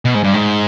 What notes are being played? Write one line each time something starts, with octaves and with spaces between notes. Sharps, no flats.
B2
G#2
G2
G#2